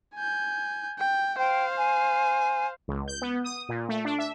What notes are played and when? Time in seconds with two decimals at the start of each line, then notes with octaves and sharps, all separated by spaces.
0.15 G#5 G6
0.98 G5
1.39 C5 F5 G5
1.78 G#5
2.88 C#2
3.08 G6
3.22 B3
3.44 D#6
3.69 A#2
3.89 A3
4.05 D4
4.19 E5